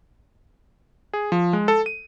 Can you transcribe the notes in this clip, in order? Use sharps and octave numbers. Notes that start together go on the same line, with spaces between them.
G#4
F3
G#3
A4
D#7